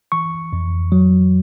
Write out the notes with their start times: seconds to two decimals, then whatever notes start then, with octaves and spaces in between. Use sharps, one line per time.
0.12 E3 C#6
0.53 F2
0.92 F#3